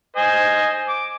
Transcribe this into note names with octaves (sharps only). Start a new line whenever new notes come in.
C5 D#5 G#5
D6